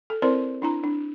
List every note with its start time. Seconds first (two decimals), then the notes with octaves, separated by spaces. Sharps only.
0.10 A4
0.22 C4 E4 A#4 C5 D5 C6
0.62 D4 E4 A#5
0.84 D4